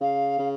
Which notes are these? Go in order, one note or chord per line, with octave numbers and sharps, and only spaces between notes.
C#3 F5
C#3